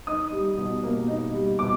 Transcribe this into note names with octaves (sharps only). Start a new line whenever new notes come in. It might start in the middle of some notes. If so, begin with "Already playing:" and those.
D#4 D#6
G3
B2
A#3
D#4
G3
B2 D6